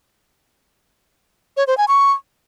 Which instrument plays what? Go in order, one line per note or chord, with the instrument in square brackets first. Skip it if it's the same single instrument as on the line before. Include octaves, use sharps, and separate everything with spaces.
[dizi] C#5
C5
G#5
C#6